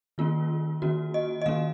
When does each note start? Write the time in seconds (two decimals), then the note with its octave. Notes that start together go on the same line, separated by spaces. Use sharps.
0.18 D#3 A#3 C#4 F4
0.82 D#3 A#3 C#4 F#4
1.14 D#5
1.42 D#5
1.46 D#3 A#3 C#4 F5